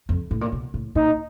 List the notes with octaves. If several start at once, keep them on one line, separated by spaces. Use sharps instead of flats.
F2
A2
A#2
B2
A2
A#2 D#4